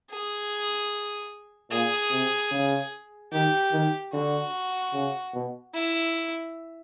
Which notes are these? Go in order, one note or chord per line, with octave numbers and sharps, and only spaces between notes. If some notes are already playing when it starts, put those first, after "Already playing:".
G#4
A#2 G#4
C3
C#3
D#3 G4
D#3
D3 F#4
C#3
B2
E4